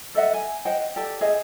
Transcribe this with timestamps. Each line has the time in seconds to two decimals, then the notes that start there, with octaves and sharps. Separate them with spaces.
0.15 A4 D#5 E5 F#5
0.33 G#5
0.65 C5 D#5 F#5 G5
0.96 G4 A4 D5 A5
1.21 G#4 C5 D#5 E5